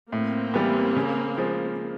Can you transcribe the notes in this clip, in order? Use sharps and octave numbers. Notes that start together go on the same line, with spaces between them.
A2 A#3 C4
E3 G3 B3
C#3
F3 G#3